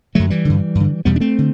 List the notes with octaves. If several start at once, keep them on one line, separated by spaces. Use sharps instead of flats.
F#2 D3 F#3 A3
E3 G3
G2 D3
G2 D3
E2 B2 G3 B3
D4
A3 C4
D3